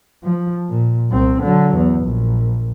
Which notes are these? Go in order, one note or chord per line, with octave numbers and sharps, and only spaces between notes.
F3
A#2
C2 C4
D3 F#3
E2
A#1